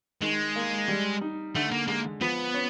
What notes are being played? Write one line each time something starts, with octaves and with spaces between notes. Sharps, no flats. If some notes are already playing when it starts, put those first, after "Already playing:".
D#3 G#3
A#3
G3
D#4
D3 A3
A#3
G#3 A#3
F3 B3
C#4